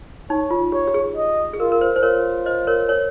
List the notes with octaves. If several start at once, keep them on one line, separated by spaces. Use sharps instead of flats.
D#4 C#5
F4
G4 C#5
G4
G#4
D#5
G#4
F4 A#4
A#4
C5
C5
F4 A#4 C#5
C5 D#5
A#4 C#5
A#4 C#5